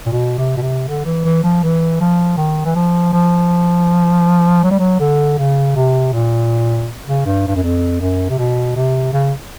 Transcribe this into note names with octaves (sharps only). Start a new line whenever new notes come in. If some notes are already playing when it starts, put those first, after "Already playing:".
A#2
B2
C3
B2
C3
D3
E3
E3
F3
E3
F3
D#3
E3
F3
F3
F#3
G3
F#3
D3
C#3
C3
A#2
C#3
G2
G2
F#2
F2
F#2
C3
B2
C3
C#3